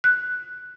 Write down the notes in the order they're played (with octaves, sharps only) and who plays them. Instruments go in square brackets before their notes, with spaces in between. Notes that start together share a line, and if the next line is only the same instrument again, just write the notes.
[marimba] F#6